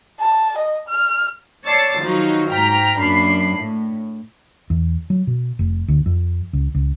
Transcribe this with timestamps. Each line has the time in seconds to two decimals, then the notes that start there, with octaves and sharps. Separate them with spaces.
0.21 A5
0.58 D#5
0.89 F6
1.65 C#5 D5 A5 E6 A6 C7
2.01 D#3 F3 F#3 D#4
2.49 G#2 G5 A#5 F6 B6
2.97 F#2 A#3 D4 B5 C7
3.56 A2
4.70 E2
5.10 F#3
5.27 B2
5.59 F1
5.88 D2
6.06 F2
6.53 C#2
6.75 C#2